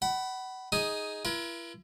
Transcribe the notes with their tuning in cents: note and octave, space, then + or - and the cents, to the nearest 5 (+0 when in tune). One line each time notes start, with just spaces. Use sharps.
F#5 +30 B5 +0
D#4 +10 G#4 +0 D#6 +0
E4 +40 A#4 +45